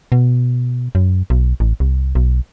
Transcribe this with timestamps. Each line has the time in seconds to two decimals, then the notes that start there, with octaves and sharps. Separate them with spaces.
0.12 B2
0.95 F#2
1.30 B1
1.60 A1
1.80 C2
2.15 B1